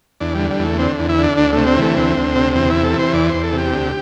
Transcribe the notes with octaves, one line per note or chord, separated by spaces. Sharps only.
E2 D4
D3 G3
G3
E2
A3
D3 C4
E2
E4
D3
D4
D2 D4
C3 A3
C4
E3 A3
D2 C4
D2
C3
E2 C4
C3 E4
A4
E3
C5
E2 D5
E2 C5
A4
C3
G4
D2